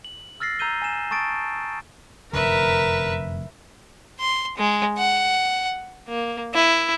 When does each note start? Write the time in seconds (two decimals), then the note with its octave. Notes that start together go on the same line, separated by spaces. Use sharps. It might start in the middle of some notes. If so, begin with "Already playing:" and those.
0.05 F#7
0.40 E6 F6 A6 A#6 C7
0.59 A#5 E6 G6 D#7 G7
0.82 G#5 E7
1.11 A5 C#6 D#6 A6 D7
2.33 F1 F#2 D3 A#4 B4 E5
4.20 C6
4.57 G#3
4.98 F#5
6.08 A#3
6.54 E4